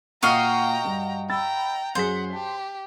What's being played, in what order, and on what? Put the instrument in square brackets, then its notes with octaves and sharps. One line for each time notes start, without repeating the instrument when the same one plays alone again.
[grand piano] A#2 [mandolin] F#4 D#5 F5 [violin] G5 A#5
[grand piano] G2
[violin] G5 A#5 [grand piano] B5 E6 A6
[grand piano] F#2 G#4 B6 [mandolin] C5 [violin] F#5
[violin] G4 [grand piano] A5